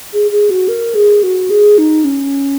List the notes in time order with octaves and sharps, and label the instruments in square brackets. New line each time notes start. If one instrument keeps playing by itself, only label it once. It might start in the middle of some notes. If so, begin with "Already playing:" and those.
[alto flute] G#4
G#4
F#4
A#4
G#4
F#4
G#4
D#4
C#4